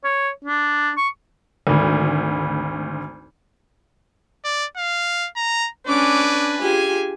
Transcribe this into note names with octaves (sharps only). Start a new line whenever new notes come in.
C#5
D4
C#6
G#1 D2
D5
F5
A#5
C#4 D4 B4 G#5 D6
F4 G4 G#4 G#5